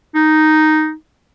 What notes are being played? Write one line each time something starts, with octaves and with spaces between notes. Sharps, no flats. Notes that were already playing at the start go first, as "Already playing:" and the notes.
D#4